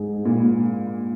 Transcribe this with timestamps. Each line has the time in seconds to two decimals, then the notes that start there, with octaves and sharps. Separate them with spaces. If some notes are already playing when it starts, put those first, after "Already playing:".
Already playing: G#2 G#3 D#4 G#4
0.25 A#2